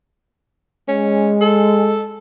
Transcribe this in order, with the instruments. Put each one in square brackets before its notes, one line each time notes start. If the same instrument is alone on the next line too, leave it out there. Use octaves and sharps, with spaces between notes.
[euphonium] G#3 [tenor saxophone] C#4
[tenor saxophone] A4